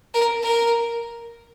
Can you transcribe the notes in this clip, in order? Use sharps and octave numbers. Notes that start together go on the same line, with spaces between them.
A#4
A#4